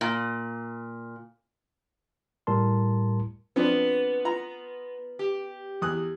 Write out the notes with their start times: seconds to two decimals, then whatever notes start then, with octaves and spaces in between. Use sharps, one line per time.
0.01 A#2
2.47 A2 G3 A#4 A5 C6
3.56 F3 B3 C4 D4
4.25 F4 A#5
5.19 G4
5.82 E2 D#6 F#6